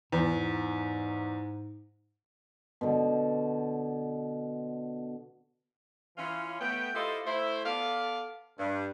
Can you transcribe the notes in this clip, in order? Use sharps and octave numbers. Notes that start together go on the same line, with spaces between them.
E2 G#2
B2 D3
E3 C#4 F4
A3 B3 G5
E4 F4 G4 A4 C5 D#5
A3 E4 C5
B3 A4 D5 F5
G2